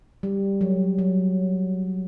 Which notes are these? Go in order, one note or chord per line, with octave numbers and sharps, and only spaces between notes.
G3
F#3
F#3